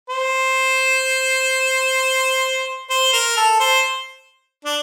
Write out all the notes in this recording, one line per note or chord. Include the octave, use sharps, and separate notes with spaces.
C5
C5
A#4
A4
C5
D4